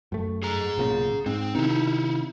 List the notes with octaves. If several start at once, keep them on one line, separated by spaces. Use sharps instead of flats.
F#2 A3
G#4 A#5
B1 A#2 C#3
G#2 C4
C3 D#3 D#4 E4